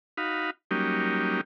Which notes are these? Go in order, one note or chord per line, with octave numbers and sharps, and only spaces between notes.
D#4 F#4 F5 B5
F#3 G3 A#3 C#4 D#4 G4